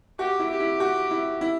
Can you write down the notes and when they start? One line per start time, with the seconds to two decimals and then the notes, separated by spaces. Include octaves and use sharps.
0.19 F#4 G4
0.39 E4
0.50 G4
0.60 E4
0.80 F#4
1.11 E4
1.41 E4